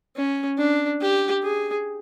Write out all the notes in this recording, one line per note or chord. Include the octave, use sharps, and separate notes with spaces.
C#4
D4
G4
G#4